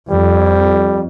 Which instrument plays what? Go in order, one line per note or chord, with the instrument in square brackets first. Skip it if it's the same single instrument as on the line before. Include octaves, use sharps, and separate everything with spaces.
[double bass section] F2 [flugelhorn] G3